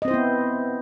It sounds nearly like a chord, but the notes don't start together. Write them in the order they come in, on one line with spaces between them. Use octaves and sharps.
D#5 C4 C5 E4 B3